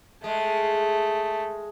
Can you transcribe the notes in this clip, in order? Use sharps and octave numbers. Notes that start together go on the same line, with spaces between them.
G#3 A3